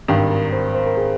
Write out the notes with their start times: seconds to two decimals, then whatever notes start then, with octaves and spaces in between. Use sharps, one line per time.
0.08 G#1 G2 D#3
0.30 A#4
0.53 C5
0.75 C5
0.87 A#4
0.97 G#4